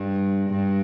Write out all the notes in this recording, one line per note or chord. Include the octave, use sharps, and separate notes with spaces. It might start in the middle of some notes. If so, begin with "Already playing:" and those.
Already playing: G2
G2